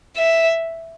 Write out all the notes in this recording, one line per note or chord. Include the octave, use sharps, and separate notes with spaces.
E5